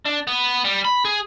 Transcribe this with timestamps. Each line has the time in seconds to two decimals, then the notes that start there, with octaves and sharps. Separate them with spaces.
0.06 D4
0.27 B3
0.64 G3
0.85 B5
1.05 G#4